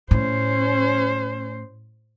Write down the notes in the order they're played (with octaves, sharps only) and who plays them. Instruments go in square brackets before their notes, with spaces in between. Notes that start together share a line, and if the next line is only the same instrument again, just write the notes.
[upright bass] A2 [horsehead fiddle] C#4 C5